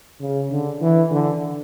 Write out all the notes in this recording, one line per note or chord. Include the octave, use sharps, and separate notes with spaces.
C#3
D3
E3
D3